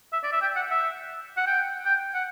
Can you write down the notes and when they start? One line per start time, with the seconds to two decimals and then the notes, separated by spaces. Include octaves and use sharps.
0.13 E5
0.23 D5
0.32 E5
0.42 G5
0.56 F#5
0.71 E5
1.37 F#5
1.47 G5
1.85 G5
2.14 F#5